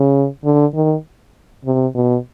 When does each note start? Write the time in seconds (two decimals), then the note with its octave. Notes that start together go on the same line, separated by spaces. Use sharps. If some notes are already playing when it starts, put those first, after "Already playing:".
Already playing: C#3
0.44 D3
0.74 D#3
1.65 C3
1.95 B2